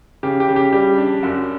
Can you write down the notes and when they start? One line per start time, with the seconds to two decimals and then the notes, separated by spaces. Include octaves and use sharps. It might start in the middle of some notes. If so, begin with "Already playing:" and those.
0.23 C#3 G4
0.40 G4
0.49 C#3
0.56 G4
0.73 G3 G4
0.98 D4
1.23 F#2 F#4